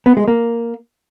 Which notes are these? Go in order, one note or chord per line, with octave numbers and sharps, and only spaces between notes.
B3
G#3
A#3